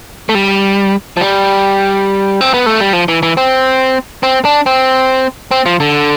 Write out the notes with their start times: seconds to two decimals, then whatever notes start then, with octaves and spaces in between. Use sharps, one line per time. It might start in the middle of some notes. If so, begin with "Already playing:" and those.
0.29 A3
0.35 G3
1.17 F3
1.21 G3
2.41 C4
2.54 B3
2.66 A3
2.80 G3
2.93 F3
3.08 E3
3.23 E3
3.37 C4
4.23 C4
4.45 D4
4.66 C4
5.51 C4
5.66 F3
5.80 D3